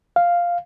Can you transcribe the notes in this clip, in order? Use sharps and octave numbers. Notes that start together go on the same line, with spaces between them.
F5